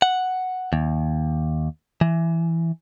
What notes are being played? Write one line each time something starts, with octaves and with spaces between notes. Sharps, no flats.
F#5
D#2
E3